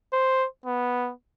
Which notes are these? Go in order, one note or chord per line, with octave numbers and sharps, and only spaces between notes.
C5
B3